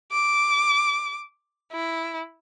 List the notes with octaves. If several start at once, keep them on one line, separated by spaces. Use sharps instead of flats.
D6
E4